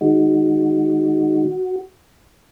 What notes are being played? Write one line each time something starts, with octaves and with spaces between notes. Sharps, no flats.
D#3 G#3 D#4 F#4